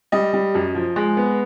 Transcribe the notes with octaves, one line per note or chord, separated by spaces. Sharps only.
G3 D#5
G3
F#2
F3
G#3
B3